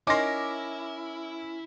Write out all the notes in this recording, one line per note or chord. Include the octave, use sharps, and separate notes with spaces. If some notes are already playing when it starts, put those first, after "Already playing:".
C#4 D#4 E4 A#4 C6 D6 A#6